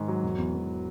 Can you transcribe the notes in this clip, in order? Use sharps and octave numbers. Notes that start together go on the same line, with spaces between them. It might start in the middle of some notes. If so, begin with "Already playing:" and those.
Already playing: G#2 D#3
F#3
E1
E2
E2